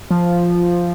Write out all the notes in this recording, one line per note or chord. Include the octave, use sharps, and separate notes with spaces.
F3